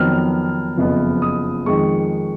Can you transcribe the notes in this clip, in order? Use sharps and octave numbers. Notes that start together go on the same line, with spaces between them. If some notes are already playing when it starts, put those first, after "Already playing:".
Already playing: F2 D#3 F#3 B3 F6
F#1 F2 F3 B3
D#6
F2 D#3 G#3 C#6